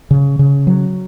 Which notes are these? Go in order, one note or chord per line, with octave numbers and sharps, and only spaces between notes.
C#3
C#3
F#3